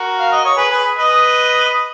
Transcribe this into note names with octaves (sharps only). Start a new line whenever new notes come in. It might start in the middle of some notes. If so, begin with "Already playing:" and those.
Already playing: F#4 A#4
F5
D#5
C#5
G#4 B4
G#4 B4
B4 D#5